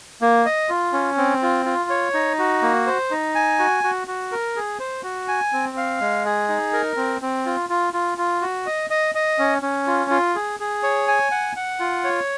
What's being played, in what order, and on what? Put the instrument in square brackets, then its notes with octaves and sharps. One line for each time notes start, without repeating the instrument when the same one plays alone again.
[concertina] A#3
D#5
F4
C#4
C4
F4
F4
C#5
D#4
F#4
A#3
C5
D#4
G#5
F#4
F#4
F#4
A#4
G#4
C5
F#4
G#5
C4
F5
G#3
G#4
D#4
A#4
C4
C4
F4
F4
F4
F4
F#4
D#5
D#5
D#5
C#4
C#4
F4
F4
G#4
G#4
C#5
G#5
F#5
F#5
F4
C#5